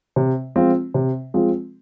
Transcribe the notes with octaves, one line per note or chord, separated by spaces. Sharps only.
C3
F3 G#3 C4 F4
C3
F3 G#3 C4 F4